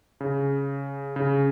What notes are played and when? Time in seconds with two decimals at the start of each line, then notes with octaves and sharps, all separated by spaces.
0.21 C#3
1.16 C#3